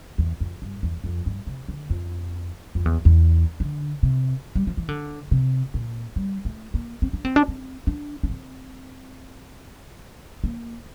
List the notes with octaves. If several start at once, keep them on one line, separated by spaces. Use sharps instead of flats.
E2
F2
G2
E2
F2
G2
C3
D3
F2
F2
E2
E2
D3
C3
G3
F3
E3
D3
C3
A#2
G3
A3
A#3
C4
D4
C4
D4
C4
D4
D4
C4
A#3